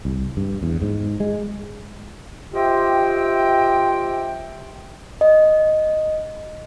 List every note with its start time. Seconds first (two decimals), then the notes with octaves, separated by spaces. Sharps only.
0.05 C2
0.37 G2
0.63 E2
0.82 G#2
1.20 G#3
2.54 F4 G4 C5 D#5 E5 G5
5.21 D#5